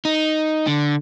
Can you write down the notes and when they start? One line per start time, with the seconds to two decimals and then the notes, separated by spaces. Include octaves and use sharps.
0.05 D#4
0.67 D3